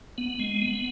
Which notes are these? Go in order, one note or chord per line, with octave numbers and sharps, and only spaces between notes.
B3
G#3
B3